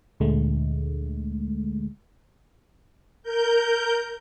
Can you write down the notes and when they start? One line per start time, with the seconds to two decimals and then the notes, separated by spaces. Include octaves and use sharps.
0.20 D2 A#2 D3 G#3 A3
3.23 A#4 G6